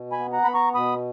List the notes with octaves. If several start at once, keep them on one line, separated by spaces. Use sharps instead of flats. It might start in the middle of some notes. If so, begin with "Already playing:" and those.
Already playing: B2
G#5 B5
B3
F#5 A#5
B3 B5
A#5 C#6
B2 B5 D#6